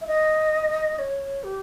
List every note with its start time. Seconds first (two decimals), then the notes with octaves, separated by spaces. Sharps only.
0.01 E5
0.07 D#5
0.99 C#5
1.44 G4